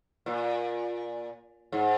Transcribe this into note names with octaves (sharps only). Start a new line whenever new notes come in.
A#2
G#2